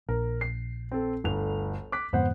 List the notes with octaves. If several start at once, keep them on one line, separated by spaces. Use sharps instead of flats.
A#1 A#4
C7
C4 A4
G1 D2 F7
D6 F#6 B6
F2 G#2 D3 B3 C5 F#5